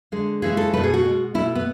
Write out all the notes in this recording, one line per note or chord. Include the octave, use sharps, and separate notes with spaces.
D3 G#3
C#3 E3 G#3 G#4
A4
B2 A3 B4
G#4
F#4
B2 G#3
B2 A3 E4
B3